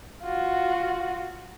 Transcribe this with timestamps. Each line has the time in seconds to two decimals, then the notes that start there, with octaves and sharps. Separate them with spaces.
0.22 F4 F#4